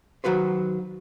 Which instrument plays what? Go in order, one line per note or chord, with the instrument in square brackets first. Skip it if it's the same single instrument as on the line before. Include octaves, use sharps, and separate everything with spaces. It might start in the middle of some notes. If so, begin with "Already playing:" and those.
[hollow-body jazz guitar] D#3 F#3 F#4 B4 C5